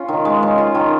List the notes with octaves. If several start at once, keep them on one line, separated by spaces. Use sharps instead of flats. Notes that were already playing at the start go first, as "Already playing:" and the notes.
Already playing: C#4 F4
D#3
G#3
C#4
F4
D#3